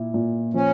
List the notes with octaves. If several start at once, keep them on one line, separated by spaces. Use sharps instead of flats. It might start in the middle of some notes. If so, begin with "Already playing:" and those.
Already playing: A#2 E4
A#2
F3 C#4